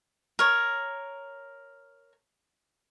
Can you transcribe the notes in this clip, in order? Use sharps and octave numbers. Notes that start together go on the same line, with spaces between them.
A#4 C#5